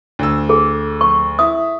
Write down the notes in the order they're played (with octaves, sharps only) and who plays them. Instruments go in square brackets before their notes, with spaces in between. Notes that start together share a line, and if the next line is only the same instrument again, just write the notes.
[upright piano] D2 E6
[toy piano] G#4 A4
C#6
[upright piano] E4 [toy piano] D#6